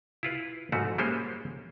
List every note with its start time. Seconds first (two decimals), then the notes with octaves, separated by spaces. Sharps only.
0.23 E4 F4 B4
0.72 G#2 F3 A3 F#4
0.98 G3 G#3 A#3 C#4 C5